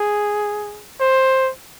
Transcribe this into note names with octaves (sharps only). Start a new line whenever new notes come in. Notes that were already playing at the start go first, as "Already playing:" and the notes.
Already playing: G#4
C5